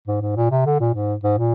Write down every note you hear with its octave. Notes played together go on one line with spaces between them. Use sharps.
G#2
G#2
A#2
C3
D3
A#2
G#2
G#2
A#2